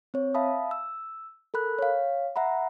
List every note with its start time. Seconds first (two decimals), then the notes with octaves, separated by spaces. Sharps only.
0.14 C4 C#5
0.34 E5 F5 A5 B5 D#6
0.71 E6
1.54 A4 A#4 B5 F#6
1.79 C#5 F5
2.36 E5 F#5 A#5 B5